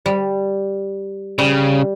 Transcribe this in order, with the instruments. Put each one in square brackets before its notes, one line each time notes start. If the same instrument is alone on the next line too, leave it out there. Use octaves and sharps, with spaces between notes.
[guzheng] G3
[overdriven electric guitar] C#3 [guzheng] G3